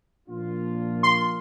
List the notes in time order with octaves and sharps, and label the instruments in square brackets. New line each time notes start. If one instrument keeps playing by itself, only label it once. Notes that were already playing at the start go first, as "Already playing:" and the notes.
[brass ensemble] A#2 F3 A#3 D4 F4
[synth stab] C6